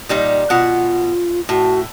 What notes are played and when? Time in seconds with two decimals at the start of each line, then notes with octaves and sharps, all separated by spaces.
0.09 A#2 G3 D#4
0.50 B2 F4 F#5
1.49 A2 F#4